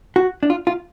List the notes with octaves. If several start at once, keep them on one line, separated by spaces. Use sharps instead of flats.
F#4
D4
F4
F4